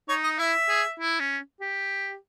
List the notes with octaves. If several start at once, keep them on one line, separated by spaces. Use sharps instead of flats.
D#4 C#5
D#5
E4 E5
G#4
E4
C#4
G4